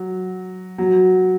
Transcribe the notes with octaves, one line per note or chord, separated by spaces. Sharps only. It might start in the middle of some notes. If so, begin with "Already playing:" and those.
Already playing: F#3
F#3